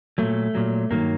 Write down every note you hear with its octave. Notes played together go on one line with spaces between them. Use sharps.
A#2 F#3 A3
A#2 F#3
G2 D#3 F#3 A#3